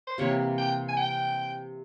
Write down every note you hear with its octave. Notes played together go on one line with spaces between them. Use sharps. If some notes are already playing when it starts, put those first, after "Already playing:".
C5
C3 E3 A#3 C#5
G5
G#5
G5